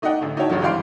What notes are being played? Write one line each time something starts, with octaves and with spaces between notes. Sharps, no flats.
A3 D#4 D5 D#5 F#5 G5
A1 D3 A3
D#4 E4 F#4 C#5 G5 A5
C#2 G2 D3 F3 F#3
G#1 E3 G3 F5 C6 D7